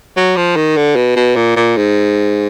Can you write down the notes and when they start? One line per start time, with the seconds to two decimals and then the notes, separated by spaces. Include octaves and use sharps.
0.17 F#3
0.37 F3
0.56 D#3
0.77 D3
0.96 B2
1.16 B2
1.36 A#2
1.56 A#2
1.77 G#2